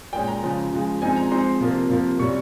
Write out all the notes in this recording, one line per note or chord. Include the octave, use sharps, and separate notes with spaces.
A#2 G#3 C#4 G5
A#5
C#3 F3 G#3
C#3 F3 G#3
F3 G#3 C4 D#4 G#5
A#5
F3 G#3 C4 D#4 C6
C3 F3 A#3
C3 F3 A#3
C3 G3 C#4 C#6